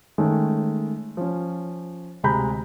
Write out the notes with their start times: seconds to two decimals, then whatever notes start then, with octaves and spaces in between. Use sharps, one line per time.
0.18 D#3 G#3 A3 C#4
1.17 F3 C#4
2.23 D2 C3 G#3 A#5 B5 G6